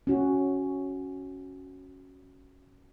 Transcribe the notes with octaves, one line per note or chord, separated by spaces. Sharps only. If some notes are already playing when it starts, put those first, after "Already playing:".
C#4 F#4